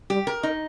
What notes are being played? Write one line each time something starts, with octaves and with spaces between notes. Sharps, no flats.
G3 G4
A#4
D#4